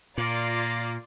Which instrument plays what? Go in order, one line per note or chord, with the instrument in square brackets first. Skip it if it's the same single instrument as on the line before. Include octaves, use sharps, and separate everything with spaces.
[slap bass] A#2 [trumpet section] A#3 [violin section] F4 D5